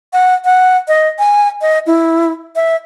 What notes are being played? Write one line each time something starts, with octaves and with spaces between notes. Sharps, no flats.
F#5
F#5
D#5
G#5
D#5
E4
E5